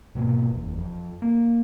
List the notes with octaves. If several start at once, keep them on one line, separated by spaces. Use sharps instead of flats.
G#2 B2 A#3
F#1 E2
F2
A#3